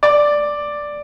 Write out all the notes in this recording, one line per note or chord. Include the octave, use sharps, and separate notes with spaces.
D5